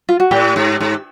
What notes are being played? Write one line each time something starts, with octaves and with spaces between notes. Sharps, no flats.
F4
F#4
A2 G4
G#2
G#2